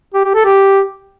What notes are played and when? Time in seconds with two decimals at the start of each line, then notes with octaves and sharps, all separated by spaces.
0.14 G4
0.25 G4
0.35 A4
0.45 G4